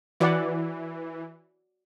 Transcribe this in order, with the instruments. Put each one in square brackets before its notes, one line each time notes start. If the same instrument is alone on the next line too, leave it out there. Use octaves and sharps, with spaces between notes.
[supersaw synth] E3 [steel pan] F#4 D5 F#5